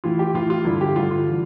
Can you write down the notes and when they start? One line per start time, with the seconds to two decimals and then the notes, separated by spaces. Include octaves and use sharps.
0.04 A2 E3 F4
0.19 G4
0.34 A2 E3 F4
0.50 F4
0.65 G2 D3 E4
0.81 G4
0.96 G2 D3 F4
1.11 F4
1.29 E3